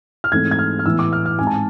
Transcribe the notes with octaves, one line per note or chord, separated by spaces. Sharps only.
F6
G#2 E3 A3 C4 G#6
G#6
F6
F6
A2 E3 B3 E6
D6
F6
F6
G#2 G#3 C4 G#5
A5